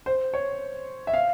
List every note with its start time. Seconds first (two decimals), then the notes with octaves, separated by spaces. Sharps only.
0.06 C5
0.34 C#5
1.07 E5
1.14 F5